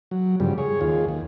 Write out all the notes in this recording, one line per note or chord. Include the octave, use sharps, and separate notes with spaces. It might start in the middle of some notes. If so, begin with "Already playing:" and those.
F#3
G2 C#3 F3 G3
G#4 C#5
D#2 F4 G#4
D#2